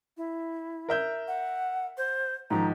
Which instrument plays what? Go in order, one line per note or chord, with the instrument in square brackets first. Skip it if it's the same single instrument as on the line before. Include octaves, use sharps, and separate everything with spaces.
[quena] E4
[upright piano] A#4 E5 G6
[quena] F#5
C5
[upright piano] G#2 D#3 F3 [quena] A#5